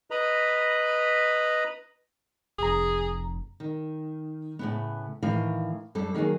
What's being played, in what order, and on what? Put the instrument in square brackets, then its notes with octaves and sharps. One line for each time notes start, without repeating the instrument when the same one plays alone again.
[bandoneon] B4 D#5 A#5 B5
[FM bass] F1 [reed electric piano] C2 A#5 [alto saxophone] G#4
[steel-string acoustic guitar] D#3
A2 C#3 B3
A2 D#3 E3 F5
F#2 G3 A4
D#3 F#3 A#3 G#4